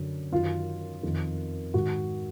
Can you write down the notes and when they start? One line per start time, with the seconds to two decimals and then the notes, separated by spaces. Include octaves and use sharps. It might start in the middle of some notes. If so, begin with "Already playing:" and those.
Already playing: F#2 D3
0.32 F#2 D#3 F4
1.03 F2 D#3
1.74 G#2 D#3 F#4